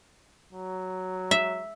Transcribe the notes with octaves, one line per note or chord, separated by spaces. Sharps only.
F#3
E5